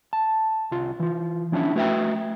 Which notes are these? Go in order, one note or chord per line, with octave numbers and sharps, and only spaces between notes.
A5
C2 F4
E3 F4
F3 C#4 D4 E4
A3 F#4 B4 D#5 E5 G5